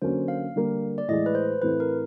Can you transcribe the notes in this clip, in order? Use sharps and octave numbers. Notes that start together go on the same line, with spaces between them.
D3 F#3 A#3 C#4 C5
F5
D3 G3 A#3
D5
A2 E3 G#3 D#5
B4
C5
A2 E3 A3 C4 E4 B4
A#4